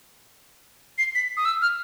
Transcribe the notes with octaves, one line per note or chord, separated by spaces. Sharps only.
C7
B6
D#6
E6
F6